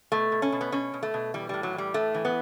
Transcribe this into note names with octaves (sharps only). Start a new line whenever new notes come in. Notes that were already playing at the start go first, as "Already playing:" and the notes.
B2 A3
B2
C#4
B2
B3
B2 C#4
B2
A3
B2
E3 G3
A2 G3
F#3
E3
G3
A2 A3
E3
B3